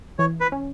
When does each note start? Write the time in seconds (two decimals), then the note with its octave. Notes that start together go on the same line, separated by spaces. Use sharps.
0.19 E3 C#5
0.41 B4
0.52 C#4